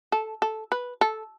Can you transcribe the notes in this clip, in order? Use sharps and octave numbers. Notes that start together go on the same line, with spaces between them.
A4
A4
B4
A4